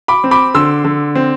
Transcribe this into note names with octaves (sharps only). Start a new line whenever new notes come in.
B5 D6
C4
B5 D6
D3 C6 E6
D3
C4